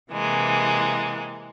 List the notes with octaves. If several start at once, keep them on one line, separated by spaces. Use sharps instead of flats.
C3 E3 G#3 A#3